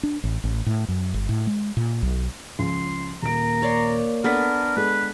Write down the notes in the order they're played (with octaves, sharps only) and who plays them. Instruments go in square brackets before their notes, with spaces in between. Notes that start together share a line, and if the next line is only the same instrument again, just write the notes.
[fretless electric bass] D4
A1
A1
A2
F#2
G1
A2
G#3
A#2
B1
[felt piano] C#2 F3 [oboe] C6
[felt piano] D#1 D7 [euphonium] A#3 [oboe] A#5
[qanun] C#5 D5 C6
[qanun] B3 D4 [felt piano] A4 A6 B6 [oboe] A#4
[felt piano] G#3 A4 [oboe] B4